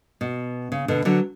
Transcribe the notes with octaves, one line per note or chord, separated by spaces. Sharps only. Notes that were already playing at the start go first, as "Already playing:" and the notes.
B2
C#3
B2 D3
D3 F#3